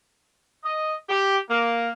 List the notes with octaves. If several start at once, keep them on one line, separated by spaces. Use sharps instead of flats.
D#5
G4
A#3